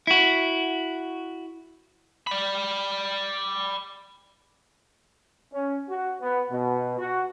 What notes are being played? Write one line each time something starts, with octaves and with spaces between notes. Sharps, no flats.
E4 F#4
D5 B5
C#4
F#4
B3
B2
F#4